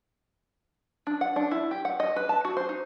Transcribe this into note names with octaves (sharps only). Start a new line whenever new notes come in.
D4
F#5
D4
E4
G4
F#5
D#5
B4
A5
F#4
C5
D#4